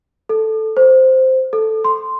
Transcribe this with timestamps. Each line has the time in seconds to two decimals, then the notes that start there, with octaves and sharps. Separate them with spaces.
0.29 A4
0.77 C5
1.53 A4
1.84 C6